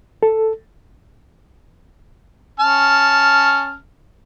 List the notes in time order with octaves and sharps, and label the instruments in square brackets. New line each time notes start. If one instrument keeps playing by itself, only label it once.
[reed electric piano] A4
[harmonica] C#4 A5 F6